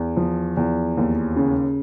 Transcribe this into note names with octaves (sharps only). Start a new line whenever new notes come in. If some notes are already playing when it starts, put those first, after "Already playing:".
Already playing: E2
F3
E2
D#2
C#3